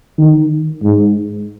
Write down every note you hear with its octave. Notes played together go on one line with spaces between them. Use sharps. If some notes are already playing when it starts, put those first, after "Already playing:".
D#3
G#2